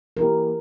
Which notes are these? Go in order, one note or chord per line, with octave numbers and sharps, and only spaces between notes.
E3 A#3 E4 G4 A#4